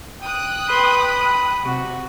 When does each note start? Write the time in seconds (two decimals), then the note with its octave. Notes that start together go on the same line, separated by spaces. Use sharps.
0.22 G5 D#6 F#6
0.69 B4 C6
1.05 B5
1.63 C3 F#4